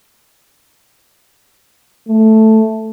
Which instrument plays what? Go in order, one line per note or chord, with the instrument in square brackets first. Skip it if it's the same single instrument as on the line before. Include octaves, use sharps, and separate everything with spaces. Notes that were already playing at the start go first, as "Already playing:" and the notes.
[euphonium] A3